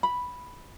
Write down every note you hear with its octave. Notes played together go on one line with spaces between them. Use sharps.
B5